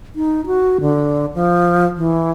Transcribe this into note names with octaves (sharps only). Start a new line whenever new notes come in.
D#4
F#4
D3
F3
E3